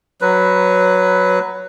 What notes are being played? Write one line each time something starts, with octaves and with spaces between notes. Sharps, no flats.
F#3 B4